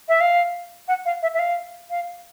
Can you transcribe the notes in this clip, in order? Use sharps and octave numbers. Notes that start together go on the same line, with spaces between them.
E5
F5
F#5
F5
E5
E5
F5
F5